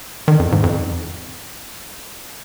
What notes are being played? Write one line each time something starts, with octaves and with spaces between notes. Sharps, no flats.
D#3
F2
G#2
F2